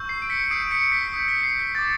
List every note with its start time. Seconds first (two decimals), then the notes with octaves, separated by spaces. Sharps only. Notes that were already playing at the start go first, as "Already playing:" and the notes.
Already playing: C#6 E6 G6
0.09 C7
0.22 D7
0.30 B6 C#7
0.51 D#6 G6 C7 D7
0.71 B6 C#7
0.92 B6
1.13 D#6 G6
1.28 B6
1.43 C7
1.59 B6
1.75 D6 G6 A6